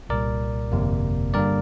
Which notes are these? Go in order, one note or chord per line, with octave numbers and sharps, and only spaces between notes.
C2 A#2 G3 A#4 D5
G1 F2 C3 A#3
G2 D3 G3 A#3 A#4 D5